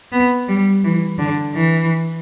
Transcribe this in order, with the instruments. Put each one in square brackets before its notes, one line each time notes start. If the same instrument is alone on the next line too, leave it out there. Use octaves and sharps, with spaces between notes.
[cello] B3
G3
E3
D3
E3